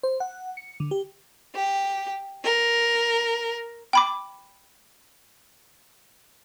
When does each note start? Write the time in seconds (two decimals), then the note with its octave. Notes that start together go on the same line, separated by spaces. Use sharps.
0.03 C5
0.20 F#5
0.57 C#7
0.80 D3
0.91 G4
1.55 G4
2.44 A#4
3.93 G5 B5 D6